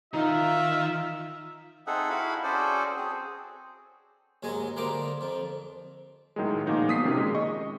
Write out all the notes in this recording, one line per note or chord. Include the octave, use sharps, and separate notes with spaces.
D#3 D#4 F4 E5
C4 D#4 G#4 A4 E5 F#5
E4 F#4 E5 F5 B5
C#4 F#4 G#4 A4 C5 D5
C4 G#4
D#2 G#2 F#3 G#3 D#5 G#5
D3 G3 A#3 C5 D#5 D6
F2 F3
A2 D#3 F#3 G#3
A#2 F3 D#4 F#4
B2 D#6 B6 C7
C3 D#3 C#4
A#2 G#3
D#5 C#6